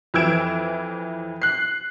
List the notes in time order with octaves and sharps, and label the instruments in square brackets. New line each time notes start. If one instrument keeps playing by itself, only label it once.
[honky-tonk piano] F2 E3 E6 G#6 D7 E7
F#6 C7